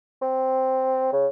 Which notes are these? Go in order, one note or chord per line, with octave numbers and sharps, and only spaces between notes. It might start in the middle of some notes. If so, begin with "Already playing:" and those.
C4
C#3